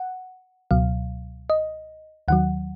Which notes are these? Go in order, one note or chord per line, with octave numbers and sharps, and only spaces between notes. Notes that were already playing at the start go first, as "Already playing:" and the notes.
Already playing: F#5
C#2 B2 F#3 F5
D#5
D#2 D#3 F#3 F#5